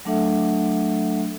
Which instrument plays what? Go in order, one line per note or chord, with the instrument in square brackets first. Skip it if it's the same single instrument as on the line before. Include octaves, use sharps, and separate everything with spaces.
[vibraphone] F#3 A3 D4 A4 E5 F#5